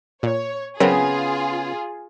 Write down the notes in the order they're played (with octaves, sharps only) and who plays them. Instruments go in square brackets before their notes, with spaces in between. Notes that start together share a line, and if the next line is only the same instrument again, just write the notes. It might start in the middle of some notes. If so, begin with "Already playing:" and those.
[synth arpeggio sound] A#2 [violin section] C#5
[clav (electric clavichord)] C#3 B3 [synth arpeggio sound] F#3 C4 A#4 [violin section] F4 G#4